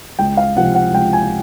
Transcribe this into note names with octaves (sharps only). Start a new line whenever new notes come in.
C#2 G5
F5
C3 F3 F#5
F#5
C#2 G5
G#5